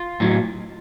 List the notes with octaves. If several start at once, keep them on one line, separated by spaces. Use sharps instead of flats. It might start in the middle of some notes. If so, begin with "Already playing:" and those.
Already playing: F4
A2 F#3